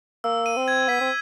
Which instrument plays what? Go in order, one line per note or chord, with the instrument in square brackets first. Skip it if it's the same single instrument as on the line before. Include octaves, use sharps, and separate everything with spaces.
[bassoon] A#3 [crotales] E6
[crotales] D#7
[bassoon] C4
[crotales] G#6
[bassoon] B3 [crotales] B6
[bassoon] C4